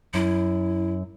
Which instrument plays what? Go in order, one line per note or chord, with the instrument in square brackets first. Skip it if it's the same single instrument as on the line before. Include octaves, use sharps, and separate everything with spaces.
[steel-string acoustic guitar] F#2 [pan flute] E4